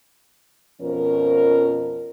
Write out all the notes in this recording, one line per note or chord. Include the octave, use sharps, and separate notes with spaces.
F2 B2 F3 C#4 A#4